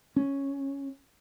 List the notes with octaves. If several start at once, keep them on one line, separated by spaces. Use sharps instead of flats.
C#4